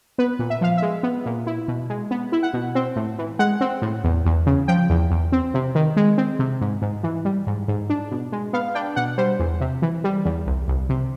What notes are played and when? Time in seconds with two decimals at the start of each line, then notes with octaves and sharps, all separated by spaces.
0.18 B3 B4
0.39 A#2
0.50 E5
0.61 F3 F5
0.77 E5
0.82 G#3
1.03 B3
1.26 A#2
1.47 E4
1.68 B2
1.90 G#3
2.11 B3
2.32 E4
2.43 F#5
2.53 B2
2.75 C4
2.96 A2
3.19 E3
3.39 G#3 F#5
3.61 C4
3.82 A2
4.04 E2
4.25 E2
4.46 C#3
4.68 F3 G5
4.90 E2
5.11 E2
5.32 C4
5.54 C3
5.75 D#3
5.97 G#3
6.18 C4
6.39 C3
6.61 G#2
6.82 G#2
7.03 E3
7.25 G3
7.47 G#2
7.68 G#2
7.90 D4
8.11 B2
8.32 G#3
8.53 B3 F5
8.75 D4 G5
8.96 B2 F#5
9.18 G3 C5
9.39 E2
9.61 C3
9.82 E3
10.04 G3
10.25 E2
10.46 C2
10.68 C2
10.89 C3